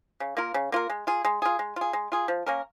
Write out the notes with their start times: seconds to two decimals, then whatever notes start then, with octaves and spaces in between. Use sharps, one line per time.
0.20 C#3
0.37 A#3 F4 A#4
0.54 C#3
0.72 A#3 F4 A#4
0.89 G#3
1.07 F4 G#4
1.24 G#3
1.42 F4 G#4
1.59 G#3
1.76 F4 G#4
1.93 G#3
2.12 F4 G#4
2.28 F3
2.46 A#3 C#4 A#4